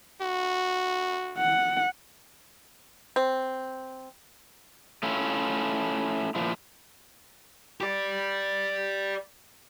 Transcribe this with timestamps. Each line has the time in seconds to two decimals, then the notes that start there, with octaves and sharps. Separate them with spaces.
0.21 F#4
1.38 F#5
3.16 C4
5.03 A3 C#4 E4 F4
6.35 A#2 F3 E4
7.81 G4 D5